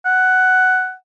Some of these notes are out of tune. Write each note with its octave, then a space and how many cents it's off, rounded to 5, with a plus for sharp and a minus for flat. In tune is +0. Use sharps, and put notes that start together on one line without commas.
F#5 +10